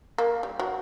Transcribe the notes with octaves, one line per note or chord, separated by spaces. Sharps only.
A#3
G3
F#3